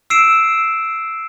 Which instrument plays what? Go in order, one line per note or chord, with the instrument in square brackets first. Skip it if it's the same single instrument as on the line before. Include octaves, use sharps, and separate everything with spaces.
[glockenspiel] E6 C7 D7 E7